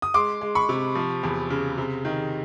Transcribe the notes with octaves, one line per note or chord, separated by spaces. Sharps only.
D#6
G#3 C6 D6
G#3
B5 C#6
C3
F3
E2
C#3
C3
D#3